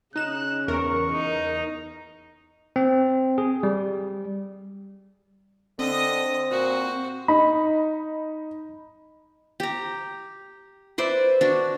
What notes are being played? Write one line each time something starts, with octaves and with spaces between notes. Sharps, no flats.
C#3 D#4 F#6 E7
E2 A#4 C#6
D#4
C4
G#4
G3
D3 C4 D#5 D#6
A#2 F#4 C5
D#4 B5
G4 A#5
B4 C5 D5 E5
D4 F#4